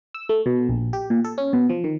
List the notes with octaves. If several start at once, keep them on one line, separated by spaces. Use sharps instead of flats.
E6
A3
B2
A#1
G4
A#2
A4
C#4
B2
F3
D#3